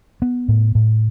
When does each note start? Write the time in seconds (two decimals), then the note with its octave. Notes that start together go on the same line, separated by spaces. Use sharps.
0.22 B3
0.48 A2
0.75 A2